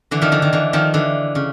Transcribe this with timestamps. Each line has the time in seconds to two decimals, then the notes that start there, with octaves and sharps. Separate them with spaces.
0.11 D3 E3
0.21 D#3 F3
0.32 D3 E3
0.42 D#3
0.53 D3 E3
0.73 D#3 F3
0.94 D3 E3
1.35 C#3